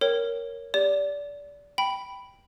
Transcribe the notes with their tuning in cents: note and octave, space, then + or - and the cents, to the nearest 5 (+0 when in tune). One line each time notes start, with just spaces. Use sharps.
A#4 +0 C#5 +0 G5 +0
G4 +20 D5 -25
G5 +0 B5 +0